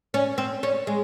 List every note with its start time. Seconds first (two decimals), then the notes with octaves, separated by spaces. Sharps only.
0.14 C#4
0.38 C4
0.63 C#4
0.87 G#3